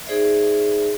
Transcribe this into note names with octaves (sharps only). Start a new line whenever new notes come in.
D#4 G#4 C5 D5 E5